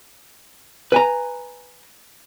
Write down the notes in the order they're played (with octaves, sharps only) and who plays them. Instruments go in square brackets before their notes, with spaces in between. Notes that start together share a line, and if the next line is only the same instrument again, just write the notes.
[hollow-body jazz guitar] B4 G#5 A#5